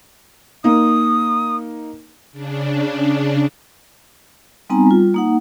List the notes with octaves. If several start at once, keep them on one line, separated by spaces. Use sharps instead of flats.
A#3 D#4 D#6
C#3 D4
G3 B3 C4 D#4 G#5 A#5
G3 F4
A#3 D#4 F#5